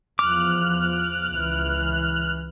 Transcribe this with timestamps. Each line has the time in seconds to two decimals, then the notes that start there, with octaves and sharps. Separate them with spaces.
0.19 E2 F3 D6 F6 F#6
1.31 C#2 E3